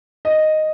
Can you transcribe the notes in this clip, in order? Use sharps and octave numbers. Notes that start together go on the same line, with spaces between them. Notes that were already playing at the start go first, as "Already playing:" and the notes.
D#5